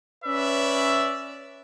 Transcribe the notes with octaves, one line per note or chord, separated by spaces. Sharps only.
C#4 B4 D5 E5